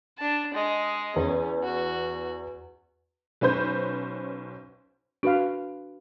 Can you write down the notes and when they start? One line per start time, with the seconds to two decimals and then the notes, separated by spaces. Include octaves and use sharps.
0.18 D4 A5
0.54 G#3 D#5
1.16 E2 C#4
1.63 F#4
3.41 B1 C#4 B4 C5 G6
5.23 D4 F#4 B4 F5